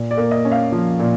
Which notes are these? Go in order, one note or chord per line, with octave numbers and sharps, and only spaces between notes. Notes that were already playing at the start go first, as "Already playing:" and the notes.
Already playing: A#2
D5
A#3
D#5
C#4
F5
F3
A#2